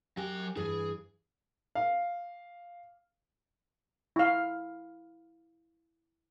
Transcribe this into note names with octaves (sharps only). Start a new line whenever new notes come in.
F#3 G4 G#5
G2 E3 G#4
F5
E4 F5